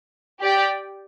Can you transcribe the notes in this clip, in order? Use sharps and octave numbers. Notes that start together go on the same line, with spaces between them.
G4 D5 G5